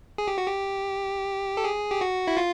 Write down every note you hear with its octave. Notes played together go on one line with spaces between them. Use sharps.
G#4
G4
F#4
G4
A4
G#4
G4
F#4
E4
F4